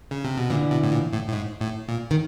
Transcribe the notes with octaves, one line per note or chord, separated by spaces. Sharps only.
C#3
C3
B2
A#2 D3 E3
B2
A2
A#2
A2
A2
G#2
A2
A#2
D#3